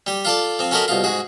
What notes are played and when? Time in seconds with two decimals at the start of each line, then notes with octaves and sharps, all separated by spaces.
0.07 G3 G4
0.25 F4 A4 D5
0.59 F3 C4
0.71 C#4 F#4 A4 A#4 D#5 B5
0.88 C2 B2 F4
1.04 G#2 F#4 G#4